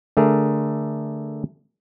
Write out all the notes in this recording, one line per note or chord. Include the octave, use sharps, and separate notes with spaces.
D3 A3 G#4 A#4